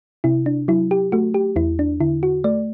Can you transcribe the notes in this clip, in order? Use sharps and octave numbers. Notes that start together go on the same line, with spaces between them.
C3 E4
D4
F#3 E4
G4
A3 F#4
G4
E2 E4
D4
D3 E4
F#4
A3 D5